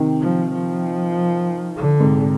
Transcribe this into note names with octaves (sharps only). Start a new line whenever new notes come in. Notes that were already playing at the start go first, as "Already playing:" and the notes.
Already playing: C3 D#3
F3
F3
D3
G#2 C3